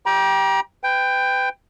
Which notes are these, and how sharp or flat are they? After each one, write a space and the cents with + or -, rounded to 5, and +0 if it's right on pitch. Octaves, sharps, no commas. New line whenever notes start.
G4 +0 G5 +0 A#5 +40
B4 +30 G5 +10